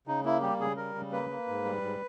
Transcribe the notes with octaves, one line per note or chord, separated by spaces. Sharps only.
C#3 D#4
A#3 E4
G3 G4
C#3 G#4
G3 A#4
C#3
A#3 B4
A#3
G#2
G3
G#2